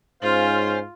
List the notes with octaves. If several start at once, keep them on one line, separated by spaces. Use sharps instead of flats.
G#2 C#4 F4 C5 F5